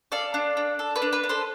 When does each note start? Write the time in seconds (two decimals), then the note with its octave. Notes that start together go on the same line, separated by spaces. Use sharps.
0.12 A4 D5 F5
0.34 D4
0.57 D4
0.79 A4
0.96 B4 D5
1.02 D4
1.13 B4
1.24 D4
1.29 A4 C5